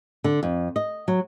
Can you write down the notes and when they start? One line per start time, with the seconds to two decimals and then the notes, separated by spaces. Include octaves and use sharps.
0.24 D3
0.43 F2
0.76 D#5
1.08 F#3